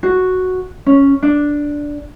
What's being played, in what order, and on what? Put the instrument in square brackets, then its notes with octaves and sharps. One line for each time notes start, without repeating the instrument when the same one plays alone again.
[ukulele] F#4
C#4
D4